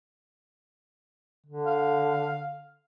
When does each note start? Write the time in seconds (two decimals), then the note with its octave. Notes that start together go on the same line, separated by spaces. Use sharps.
1.46 D3
1.66 F5